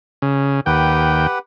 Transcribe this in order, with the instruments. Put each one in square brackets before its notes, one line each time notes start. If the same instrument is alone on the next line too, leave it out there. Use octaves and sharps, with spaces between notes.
[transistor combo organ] C#3
[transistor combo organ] D#2 G5 [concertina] G4 B4 F#5